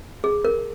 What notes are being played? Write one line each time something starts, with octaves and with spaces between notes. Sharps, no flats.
G#4
A#4